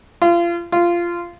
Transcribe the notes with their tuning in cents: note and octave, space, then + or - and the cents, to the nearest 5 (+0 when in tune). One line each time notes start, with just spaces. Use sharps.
F4 -30
F4 -15